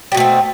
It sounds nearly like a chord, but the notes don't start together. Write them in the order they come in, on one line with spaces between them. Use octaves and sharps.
G3 B2 A3 C4